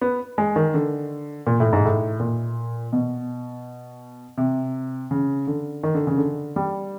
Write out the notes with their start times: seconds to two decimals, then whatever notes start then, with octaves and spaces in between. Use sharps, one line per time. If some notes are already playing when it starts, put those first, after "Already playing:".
0.01 B3
0.38 G#3
0.56 D#3
0.74 D3
1.47 A#2
1.60 A2
1.73 G#2
1.85 A2
2.20 A#2
2.93 B2
4.38 C3
5.11 C#3
5.47 D3
5.83 D#3
5.95 D3
6.07 C#3
6.18 D3
6.56 G3